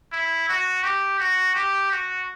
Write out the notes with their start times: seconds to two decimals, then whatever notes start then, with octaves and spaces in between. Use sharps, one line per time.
0.12 E4
0.49 F#4
0.83 G4
1.19 F#4
1.55 G4
1.91 F#4